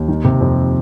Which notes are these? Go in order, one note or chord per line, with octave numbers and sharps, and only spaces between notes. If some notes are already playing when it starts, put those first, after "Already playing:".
Already playing: D#2
D#3
C3
F2